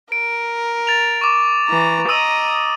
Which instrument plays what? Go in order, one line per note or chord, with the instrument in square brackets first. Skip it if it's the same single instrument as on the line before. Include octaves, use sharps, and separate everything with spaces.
[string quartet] A#4 [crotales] D7
[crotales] A6 F7
C#6 D6
[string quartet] E3 A#5
[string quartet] D#5 A#5 [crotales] D#6 E6 D#7